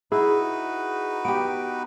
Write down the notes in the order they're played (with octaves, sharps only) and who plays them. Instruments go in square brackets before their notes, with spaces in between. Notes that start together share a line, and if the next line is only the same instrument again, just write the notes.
[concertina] D#4 F#4 B4 [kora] E4 [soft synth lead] G#4
[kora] B3 G4 [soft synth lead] D7